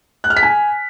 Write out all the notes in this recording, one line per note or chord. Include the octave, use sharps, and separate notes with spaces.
F#6
F6
B6
G#5